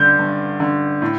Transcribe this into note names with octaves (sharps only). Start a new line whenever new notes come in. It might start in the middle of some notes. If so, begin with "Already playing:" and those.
Already playing: G2 D3 G6
G2
D3
A2